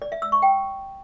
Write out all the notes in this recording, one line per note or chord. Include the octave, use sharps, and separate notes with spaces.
D5
E5
E6
C#6
G5